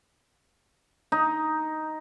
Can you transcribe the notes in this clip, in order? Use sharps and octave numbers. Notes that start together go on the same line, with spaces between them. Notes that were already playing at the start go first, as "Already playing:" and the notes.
D#4